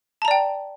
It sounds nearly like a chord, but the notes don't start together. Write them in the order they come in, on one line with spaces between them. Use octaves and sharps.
A5 A#5 D5 G5